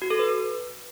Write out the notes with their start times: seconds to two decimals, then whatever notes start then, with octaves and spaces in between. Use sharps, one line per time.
0.02 F#4
0.10 A4
0.19 B4